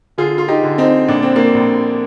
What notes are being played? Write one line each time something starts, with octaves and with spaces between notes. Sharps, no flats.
D3 F4 G#4
F4
D#4 G4
D3
C4 D#4
A#1 D4
C4
A#3 D4
A#1